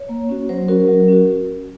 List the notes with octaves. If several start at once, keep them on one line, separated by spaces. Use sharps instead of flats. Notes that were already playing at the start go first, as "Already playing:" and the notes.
Already playing: C#5
A#3
C#4 F#4
F#3 C5
C#4 F#4 A#4
F#3
C#4 F#4